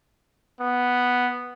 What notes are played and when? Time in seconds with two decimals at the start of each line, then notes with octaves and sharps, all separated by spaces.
0.61 B3